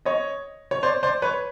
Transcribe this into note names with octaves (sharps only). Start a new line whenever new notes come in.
C#5 D#5
C#5
C5 D5
C5 D5
B4 C#5